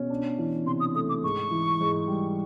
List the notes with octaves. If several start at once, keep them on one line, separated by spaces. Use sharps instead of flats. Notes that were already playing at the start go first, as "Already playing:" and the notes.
Already playing: B2 C#4
D4
E3
C3 C6
D#6
A3 D#6
D6
G#2 C#6
E3
G#2
G3